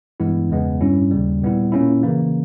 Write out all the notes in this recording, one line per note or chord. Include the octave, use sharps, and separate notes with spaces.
G2 E3 G#3 B3 E4
E2 C#3 G#3 B3
G2 G3 C#4 E4
D#2 C#3 G3
A#2 G3 B3 E4
A#2 A#3 C#4 E4
C#3 E3 A#3